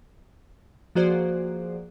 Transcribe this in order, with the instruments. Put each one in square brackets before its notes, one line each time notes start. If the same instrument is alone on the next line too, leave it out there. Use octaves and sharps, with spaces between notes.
[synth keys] F3 A#3 F#4 G#4 C5 D5